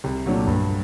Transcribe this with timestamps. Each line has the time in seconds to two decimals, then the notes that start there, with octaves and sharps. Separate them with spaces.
0.04 C2
0.26 A#2 F#3 A3 D4
0.47 G2